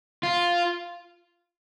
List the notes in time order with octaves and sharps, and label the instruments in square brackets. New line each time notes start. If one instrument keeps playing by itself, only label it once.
[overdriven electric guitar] F4